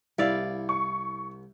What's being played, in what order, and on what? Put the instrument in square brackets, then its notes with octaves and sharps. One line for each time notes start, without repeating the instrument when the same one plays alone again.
[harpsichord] C2 [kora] E4 D5 F5
[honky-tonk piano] C#6